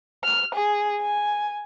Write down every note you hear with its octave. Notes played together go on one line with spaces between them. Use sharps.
F6
G#4
G#5